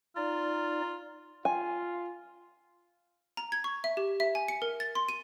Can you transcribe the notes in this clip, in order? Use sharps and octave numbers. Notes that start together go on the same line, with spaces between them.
D#4 F4 D5
F4 G#5
A#5
G#6
C#6
E5
G4
E5
G#5
C#7
A#4
A6
C6
D#7